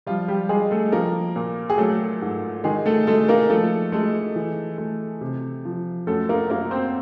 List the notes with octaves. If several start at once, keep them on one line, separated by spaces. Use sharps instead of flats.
F3 G3 F4
G3 G4
G3 G#3 G#4
A3 A4
F3 A#3 A#4
A#2
G#4
F#3 A3 A4
G#2
D#3 G#3 G#4
A3 A4
G#3 A3 A4
A#3 A#4
F3 A3 A4
G#3 A3 A4
E3
A3
C3
F3
F#2 A3 A4
A#3 A#4
F#2 A#3 A#4
C4 C5